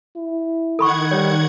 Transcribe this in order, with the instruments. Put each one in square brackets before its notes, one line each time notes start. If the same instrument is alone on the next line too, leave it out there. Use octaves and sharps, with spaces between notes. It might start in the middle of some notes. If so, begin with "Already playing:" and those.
[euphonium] E4
[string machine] D#3 F#5 G#6 [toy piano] A4 B5 C#6
[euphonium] G3 [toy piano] C#5